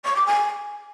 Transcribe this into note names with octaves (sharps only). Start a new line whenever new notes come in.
C#6
D6
G#5